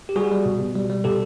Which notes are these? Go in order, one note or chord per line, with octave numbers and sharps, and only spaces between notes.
G4
G3 F#4 G#4
G3
B2
B2
G3
G3
B2 G4 A4